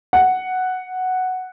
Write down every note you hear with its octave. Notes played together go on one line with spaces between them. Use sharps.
F#5